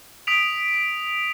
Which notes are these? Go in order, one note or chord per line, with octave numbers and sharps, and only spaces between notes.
D#6 B6 D7 F7